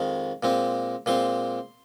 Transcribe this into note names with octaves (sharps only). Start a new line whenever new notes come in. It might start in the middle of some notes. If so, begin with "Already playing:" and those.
Already playing: F2 D#3 G#3
A#2 G#3 C4
A#2 G#3 C4 C6